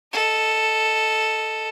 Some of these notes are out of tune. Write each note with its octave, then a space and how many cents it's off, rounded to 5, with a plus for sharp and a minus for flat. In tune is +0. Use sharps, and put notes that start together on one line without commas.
A4 +0 D#5 +0